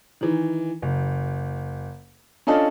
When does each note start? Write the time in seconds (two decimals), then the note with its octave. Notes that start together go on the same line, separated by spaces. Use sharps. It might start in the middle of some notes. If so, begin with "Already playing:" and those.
0.21 D#3 E3
0.82 F#1
2.47 C#4 D4 F4 A4 D#5